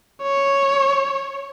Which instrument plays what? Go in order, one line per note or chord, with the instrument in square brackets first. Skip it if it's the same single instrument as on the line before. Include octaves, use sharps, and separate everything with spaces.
[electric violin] C#5